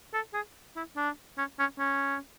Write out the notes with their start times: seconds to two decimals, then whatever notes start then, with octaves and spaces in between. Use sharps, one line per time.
0.13 A4
0.34 G#4
0.76 E4
0.96 D4
1.38 C#4
1.59 C#4
1.79 C#4